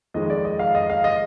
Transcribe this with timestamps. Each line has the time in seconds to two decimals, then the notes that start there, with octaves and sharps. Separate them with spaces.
0.14 F2 D#3 G#3 D#5
0.30 D5
0.45 D#5
0.59 F5
0.75 D#5
0.90 F5
1.04 D#5